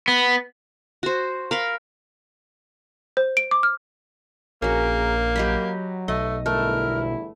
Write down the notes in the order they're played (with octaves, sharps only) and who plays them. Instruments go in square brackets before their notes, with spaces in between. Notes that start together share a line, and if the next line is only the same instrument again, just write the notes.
[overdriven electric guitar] B3
[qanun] F#4 C5
A#4 F5 B5
[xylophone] C5
D7
D6
F6
[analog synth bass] A#1 [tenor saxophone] A#3 [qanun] C#4 F#4 [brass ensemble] G#4 A#4
[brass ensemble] F#3 [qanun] G4 D#5 B5
[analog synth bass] B1 [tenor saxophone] A3 [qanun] D#5
[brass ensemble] G1 E2 E4 [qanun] A3 [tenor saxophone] A#4